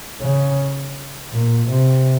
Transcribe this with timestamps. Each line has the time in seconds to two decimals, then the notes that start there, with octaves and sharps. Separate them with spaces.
0.21 C#3
1.32 A#2
1.70 C3